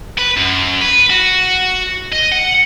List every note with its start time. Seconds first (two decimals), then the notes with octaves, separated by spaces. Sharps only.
0.18 B4
0.37 F#2
0.81 B4
1.10 F#4
2.13 D#5
2.32 F#5